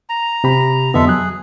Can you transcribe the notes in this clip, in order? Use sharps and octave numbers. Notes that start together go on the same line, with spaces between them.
A#5
C3 G4 B5
F2 D3 G#3 B3 A4 E5
F#3 G#4 F#6